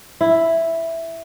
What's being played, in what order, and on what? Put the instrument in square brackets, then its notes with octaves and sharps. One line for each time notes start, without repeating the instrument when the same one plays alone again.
[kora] E4